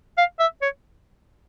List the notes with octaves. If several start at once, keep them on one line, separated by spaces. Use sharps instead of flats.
F5
E5
C#5